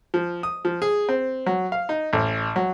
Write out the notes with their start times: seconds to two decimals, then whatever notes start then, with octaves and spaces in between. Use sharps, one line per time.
0.14 F3
0.43 D#6
0.65 F3
0.82 G#4
1.09 C4
1.46 F#3
1.72 F5
1.89 D#4
2.13 A1
2.56 F#3